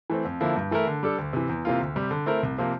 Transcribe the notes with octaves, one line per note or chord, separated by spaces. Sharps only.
E3 A3 C4
F2
D3 F3 A#3 E4
G2
E3 A3 E4 A#4
D3
G3 D4 A4
D2
C3 E3
E2
C3 E3 A#3 F4
D2
C3 G3
D3
A3 C4 E4 A#4
C2
C3 F3 A#3